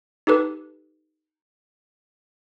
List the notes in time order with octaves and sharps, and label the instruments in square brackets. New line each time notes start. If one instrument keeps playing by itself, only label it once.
[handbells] D#4 G4 A4 B4